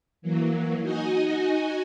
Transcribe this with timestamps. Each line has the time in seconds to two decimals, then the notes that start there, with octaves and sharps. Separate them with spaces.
0.22 E3 F#3 A#3
0.81 D#4 F#4 D#5 G#5